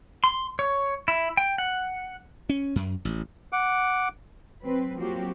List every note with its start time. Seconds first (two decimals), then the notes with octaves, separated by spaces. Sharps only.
0.24 C6
0.59 C#5
1.08 E4
1.37 G5
1.58 F#5
2.49 C#4
2.76 F#2
3.05 A1
3.53 F#5 D6
4.62 F#3 C4 B4
4.97 F3 F#3 A#3 C4 F#4 G4